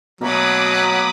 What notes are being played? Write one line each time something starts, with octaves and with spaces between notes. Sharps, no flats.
B2 F#3 A3 A#3 A#4 B5 D6 D#6